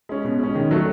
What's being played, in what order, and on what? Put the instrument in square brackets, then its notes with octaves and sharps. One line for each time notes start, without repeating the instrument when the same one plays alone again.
[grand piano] G#3 C#4
B2
G#3 C#4
D#3
F#3 A3